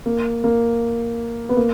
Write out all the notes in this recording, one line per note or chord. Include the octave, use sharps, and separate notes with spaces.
A#3
A#3
B3
A#3